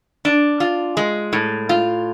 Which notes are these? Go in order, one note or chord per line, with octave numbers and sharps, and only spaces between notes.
D4
F4
G#3
A2
F4